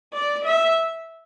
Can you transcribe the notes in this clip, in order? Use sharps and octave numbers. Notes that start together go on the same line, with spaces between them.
D5
E5